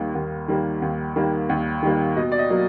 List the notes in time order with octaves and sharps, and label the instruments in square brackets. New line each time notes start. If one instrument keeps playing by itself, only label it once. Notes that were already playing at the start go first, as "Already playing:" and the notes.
Already playing: [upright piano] D#2 D#3 G3 A#3
D#2
D#3 G3 A#3
D#2
D#3 G3 A#3
D#2
D#3 G3 A#3
B2 D#5
D5
D#5
F#3 A#3